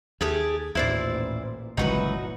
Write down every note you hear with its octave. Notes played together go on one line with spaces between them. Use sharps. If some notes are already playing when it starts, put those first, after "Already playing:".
D#2 A3 G4 G#4
A1 D#2 A#2 E4 C5 D5
G1 C#2 A#2 E3 F#3 D#4 F#4 B4